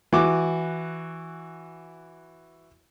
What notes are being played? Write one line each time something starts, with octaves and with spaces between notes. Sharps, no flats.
E3 F#4 D6